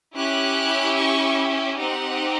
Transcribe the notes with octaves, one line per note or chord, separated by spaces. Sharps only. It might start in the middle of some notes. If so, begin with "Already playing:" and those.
C#4 E4 G4 F#6
C#6
C4 D#4 G4 F#5